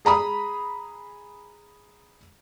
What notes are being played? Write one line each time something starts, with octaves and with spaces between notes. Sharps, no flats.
G#4 A#5 B5 D#6